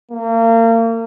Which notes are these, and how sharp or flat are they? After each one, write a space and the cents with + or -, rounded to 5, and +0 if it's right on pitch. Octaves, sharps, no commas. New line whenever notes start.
A#3 -35